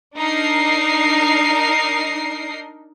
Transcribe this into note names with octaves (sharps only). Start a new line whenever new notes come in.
D4 D#4 A#4 C7